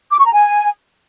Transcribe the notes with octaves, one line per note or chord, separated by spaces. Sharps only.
D6
C#6
A#5
G#5